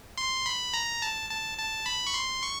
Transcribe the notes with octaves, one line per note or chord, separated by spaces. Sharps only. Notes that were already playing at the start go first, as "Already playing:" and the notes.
C6
B5
A#5
A5
A5
A5
B5
C#6
C6
C#6